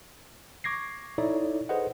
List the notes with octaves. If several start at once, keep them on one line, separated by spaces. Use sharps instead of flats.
C#6 D6 G#6 A#6 C7
D#4 E4 A4 C#5 D5 E5
G#4 A4 B4 C5 D#5 F#5